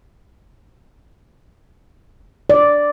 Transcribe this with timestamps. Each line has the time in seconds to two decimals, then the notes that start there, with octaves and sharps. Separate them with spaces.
2.50 D5